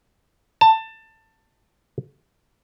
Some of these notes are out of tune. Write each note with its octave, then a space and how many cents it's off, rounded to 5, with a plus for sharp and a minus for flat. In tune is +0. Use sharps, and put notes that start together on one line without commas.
A5 +20